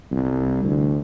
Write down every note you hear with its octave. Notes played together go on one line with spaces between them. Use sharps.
C2
D2